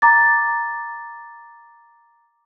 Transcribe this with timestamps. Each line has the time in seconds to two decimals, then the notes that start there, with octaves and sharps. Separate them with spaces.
0.02 A#5 D6 A6